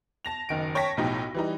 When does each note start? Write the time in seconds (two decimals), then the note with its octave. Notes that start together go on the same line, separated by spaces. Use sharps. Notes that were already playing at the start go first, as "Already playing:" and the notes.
0.25 A5 A#6 F7
0.49 F#1 D#3 D7
0.75 C#5 G5 A5 C#6 A#6 B6
0.97 B1 A2 F3 D#4 G4
1.34 E3 G3 D#4